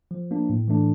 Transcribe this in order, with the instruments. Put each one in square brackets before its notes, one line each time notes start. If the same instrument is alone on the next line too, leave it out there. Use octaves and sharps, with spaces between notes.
[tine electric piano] F3
A#3 D4
A2
E3 A3 D4